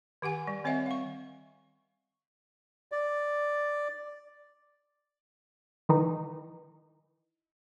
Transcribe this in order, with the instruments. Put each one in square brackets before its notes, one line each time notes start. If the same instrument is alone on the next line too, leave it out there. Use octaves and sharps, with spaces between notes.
[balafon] D#3 G4 F#5 G#5
G3
D#3 C4 C#5 D#5 E5 F#5
F5 C#6
[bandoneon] D5
[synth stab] D#3 E3 D#4